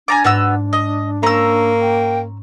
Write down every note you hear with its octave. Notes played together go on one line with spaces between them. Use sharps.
D4 G#5 A#5 D6 F6 A6
G#2 B3 F#4 E6
D#5
A#3 C#4 C5 A#5 E6
G5